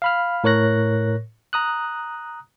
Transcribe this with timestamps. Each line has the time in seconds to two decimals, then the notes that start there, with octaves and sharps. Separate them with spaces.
0.02 F5 B5 F6
0.44 A2 A#4 C#5 C#6 F#6 A#6
1.53 A#5 D#6 F#6